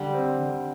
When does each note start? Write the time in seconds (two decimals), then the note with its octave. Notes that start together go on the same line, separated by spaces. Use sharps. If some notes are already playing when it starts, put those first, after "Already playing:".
Already playing: D3 G3
0.14 C4
0.39 D3